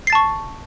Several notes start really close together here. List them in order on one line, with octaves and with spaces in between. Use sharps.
C7 A6 A5 C#6